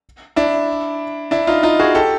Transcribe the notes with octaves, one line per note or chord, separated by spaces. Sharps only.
D4 E4
D4 E4
D#4 F4
D#4 F4
F#4 G#4
G4 A4